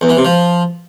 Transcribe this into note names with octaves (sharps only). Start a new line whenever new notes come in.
E2
E3
C3
F3